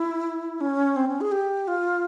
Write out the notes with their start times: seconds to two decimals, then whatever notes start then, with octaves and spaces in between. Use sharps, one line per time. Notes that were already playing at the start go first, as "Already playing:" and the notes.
Already playing: E4
0.61 C#4
0.96 C4
1.08 C#4
1.21 G#4
1.32 G4
1.68 F4